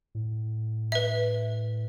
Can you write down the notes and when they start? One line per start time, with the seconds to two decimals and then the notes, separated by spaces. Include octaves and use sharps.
0.15 A2
0.92 B4 E5